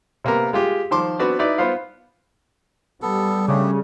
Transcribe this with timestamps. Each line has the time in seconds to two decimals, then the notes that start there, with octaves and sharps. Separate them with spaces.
0.24 C3 A#3 B3 A#4
0.53 G#3 F4 G4
0.91 D#3 F3 C6 D6
1.19 B3 C4 D4 F#4 B4 D5
1.39 D#4 E4 B4 D5
1.58 B3 F4 C5 F5
3.02 G3 B3 A4
3.48 C#3 A3 D4 G4